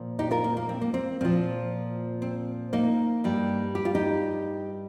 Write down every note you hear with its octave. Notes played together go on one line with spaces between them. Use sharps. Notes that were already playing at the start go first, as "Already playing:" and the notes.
Already playing: A#2 F3
D#4 G4
F4 A#4
A#3
A#3
C4
A#3
C4
A#2 F3 C4
C4
A#3 D#4
G2 G3
G4
F4
D#4 G4